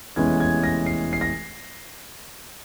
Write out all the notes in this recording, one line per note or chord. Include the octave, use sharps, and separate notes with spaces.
F1 E2 E3 G#3 C#4 G#6
G#6
A#6
C7
C7
A#6